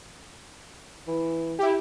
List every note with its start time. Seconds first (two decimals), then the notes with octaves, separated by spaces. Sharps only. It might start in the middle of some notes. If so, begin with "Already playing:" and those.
1.07 E3
1.59 E4 G4